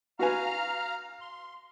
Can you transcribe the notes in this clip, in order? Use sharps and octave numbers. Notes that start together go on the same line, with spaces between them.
F#4 B4 F5 G#5 A#5 F6
C6